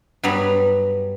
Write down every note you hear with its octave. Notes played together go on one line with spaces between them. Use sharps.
G2 F#3 G3 B3 A#5 B5